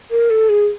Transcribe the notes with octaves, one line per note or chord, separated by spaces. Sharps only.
A#4
A4
G#4